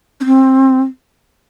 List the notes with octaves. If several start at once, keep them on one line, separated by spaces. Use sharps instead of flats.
C#4
C4